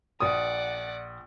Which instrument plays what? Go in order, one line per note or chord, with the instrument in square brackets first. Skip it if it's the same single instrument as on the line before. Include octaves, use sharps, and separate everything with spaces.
[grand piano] A#1 D#6 [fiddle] D5 F#5